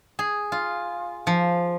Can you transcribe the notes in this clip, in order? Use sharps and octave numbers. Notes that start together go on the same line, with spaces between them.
G#4
F4
F3